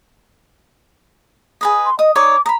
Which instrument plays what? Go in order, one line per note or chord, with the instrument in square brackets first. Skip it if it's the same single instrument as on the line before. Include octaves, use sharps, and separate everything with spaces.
[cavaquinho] G#4 B4 D#5
[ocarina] C6
[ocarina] D#5 [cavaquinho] D#6
[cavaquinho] D#4 C#5 D5 [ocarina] D6
[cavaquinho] D#5 B5 [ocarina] A#5